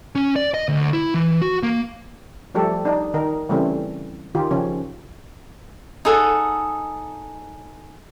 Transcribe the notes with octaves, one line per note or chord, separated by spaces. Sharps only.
C#4
D5
D#5
D2
E4
E3
F#4
A#3
F3 G3 A3 G4 A4
D4 D#4
D#3 D#4 A#4
C#3 E3 G3 A3 C4 C#4
D#3 F4 G4
C#3 F3 C#4
D#4 G#4 A4 F#5